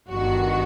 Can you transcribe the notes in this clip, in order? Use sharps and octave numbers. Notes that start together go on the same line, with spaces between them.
G1 G2 D#3 F#4